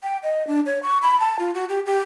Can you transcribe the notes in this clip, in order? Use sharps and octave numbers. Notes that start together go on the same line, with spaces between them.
G5
D#5
D4
C#5
C#6
B5
A5
F4
F#4
G4
G4